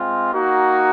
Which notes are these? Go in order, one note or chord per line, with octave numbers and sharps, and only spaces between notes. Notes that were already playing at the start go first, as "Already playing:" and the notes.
Already playing: G#3 C4 F4
A#3 D#4 F#4